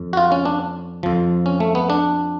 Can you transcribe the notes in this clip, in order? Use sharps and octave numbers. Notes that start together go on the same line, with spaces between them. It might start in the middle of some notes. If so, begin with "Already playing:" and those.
Already playing: F2
F#4
F4
C#4
D4
F2 F3
C#4
A3
B3
D4